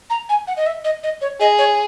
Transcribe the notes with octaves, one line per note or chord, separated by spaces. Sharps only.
A#5
G#5
F#5
D#5
E5
D#5
D#5
C#5
G#4 D#5
C#5